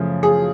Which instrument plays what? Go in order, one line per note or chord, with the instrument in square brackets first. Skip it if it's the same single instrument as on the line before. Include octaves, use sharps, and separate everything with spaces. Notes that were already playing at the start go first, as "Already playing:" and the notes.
Already playing: [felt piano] F#2 C#3 F3 A3
G#4